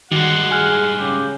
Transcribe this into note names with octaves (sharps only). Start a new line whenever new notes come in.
G2 D#3 G#3 F#4 F#5
G#4 G#5 F6 F#6
C#3 G4